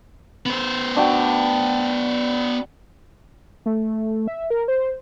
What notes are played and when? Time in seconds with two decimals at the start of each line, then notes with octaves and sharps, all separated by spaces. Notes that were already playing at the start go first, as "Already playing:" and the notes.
0.46 B3 C5
0.96 D4 F#4 G5
3.66 A3
4.28 E5
4.50 A#4
4.68 C5